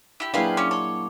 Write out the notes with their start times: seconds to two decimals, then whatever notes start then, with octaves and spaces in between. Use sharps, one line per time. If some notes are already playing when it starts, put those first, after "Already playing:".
0.20 E4 G4
0.34 A#2 F#3 D4 E4 G4 G#4 B4 F5
0.57 C#4 C#5 C6 D6
0.71 C#5 A5 C6